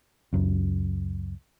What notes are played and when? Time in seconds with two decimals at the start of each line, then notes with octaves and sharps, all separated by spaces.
0.33 C#2 F#2